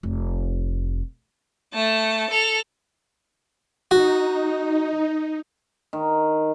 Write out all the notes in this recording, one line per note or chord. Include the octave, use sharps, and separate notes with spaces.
F1
A3 A5
A4 F7
D#4 F#4
D#3